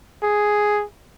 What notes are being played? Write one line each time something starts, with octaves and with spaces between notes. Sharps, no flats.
G#4